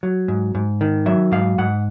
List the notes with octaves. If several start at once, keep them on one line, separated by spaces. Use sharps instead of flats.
F#3
G#2
G#2
D#3
F#3 E5
G#2 F5
G#2 F#5